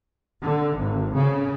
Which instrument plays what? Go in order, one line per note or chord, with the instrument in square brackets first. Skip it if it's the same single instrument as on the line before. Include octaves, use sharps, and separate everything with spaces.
[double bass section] D3
G#1
C#3